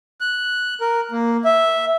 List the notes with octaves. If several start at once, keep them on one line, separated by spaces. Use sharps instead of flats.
F#6
A#4
A#3
E5